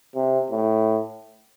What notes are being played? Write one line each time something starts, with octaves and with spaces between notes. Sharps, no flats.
C3
A2